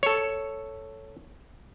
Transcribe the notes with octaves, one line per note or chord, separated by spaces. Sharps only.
A4 C#5